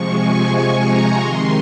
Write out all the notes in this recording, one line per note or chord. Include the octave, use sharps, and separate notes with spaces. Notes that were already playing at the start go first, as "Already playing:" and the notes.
Already playing: C3 F3 G#3 C#6
G#5
A#5
C3 D#3 G#3 C6